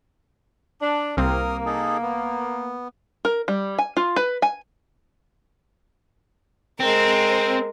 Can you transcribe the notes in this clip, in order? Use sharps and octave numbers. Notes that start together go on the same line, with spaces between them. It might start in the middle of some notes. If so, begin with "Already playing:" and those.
D4
C2 A#3 C4 A#4 D#6 F6
D#4 G#4 A4
B3
A#4
G3
G#5
F4
B4
G#5
G#3 C4 A#4